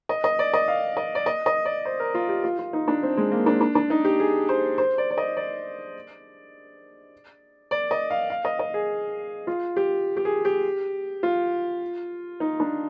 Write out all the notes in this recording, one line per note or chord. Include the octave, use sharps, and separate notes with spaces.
D#5
D#5
D5
D#5
F5
D#5
D5
D#5
D#5
D5
C5
A#4
F4
G4
F4
F4
D#4
D4
C4
G#3
A#3
D4
D4
D4
D#4
G4
G#4
C5
C5
D5
D5
D#5
D5
D5
D#5
F5
F5
D#5
D#5
G#4
F4
G4
G4
G#4
G4
F4
D#4
D4